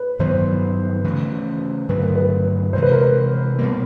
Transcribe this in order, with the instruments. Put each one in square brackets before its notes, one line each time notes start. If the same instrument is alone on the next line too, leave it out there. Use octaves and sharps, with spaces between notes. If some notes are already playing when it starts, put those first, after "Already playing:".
Already playing: [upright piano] B4
[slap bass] G2 D#3 F#3 B3 [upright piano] C5
[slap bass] C#3 E3 A3
[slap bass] G2 D3 F#3 A3 [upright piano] B4
[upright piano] A#4
B4
[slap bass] C3 E3 G#3 [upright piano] C5
[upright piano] B4
A#4
B4
[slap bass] B2 G3 A#3